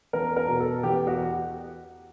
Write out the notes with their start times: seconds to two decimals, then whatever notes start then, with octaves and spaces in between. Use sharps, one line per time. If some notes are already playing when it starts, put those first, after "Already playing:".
0.13 E2 A#4
0.36 A#4
0.48 B2
0.60 A4
0.83 E2 G4
1.07 F#4